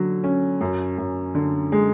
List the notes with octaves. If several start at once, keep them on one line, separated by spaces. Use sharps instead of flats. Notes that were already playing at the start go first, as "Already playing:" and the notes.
Already playing: D3 F#3
C#4
F#2
F#2
D3
G#3